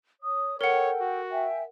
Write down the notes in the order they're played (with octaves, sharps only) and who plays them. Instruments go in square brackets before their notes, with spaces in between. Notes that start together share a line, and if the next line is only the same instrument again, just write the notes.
[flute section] C#5 D#6
[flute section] A4 G5 [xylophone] A#4 F#5 [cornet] C#5
[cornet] F#4
[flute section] E5 G5 G#5